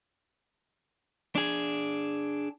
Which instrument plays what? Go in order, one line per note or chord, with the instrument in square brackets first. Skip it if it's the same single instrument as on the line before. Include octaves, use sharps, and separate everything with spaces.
[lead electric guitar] D4 G#4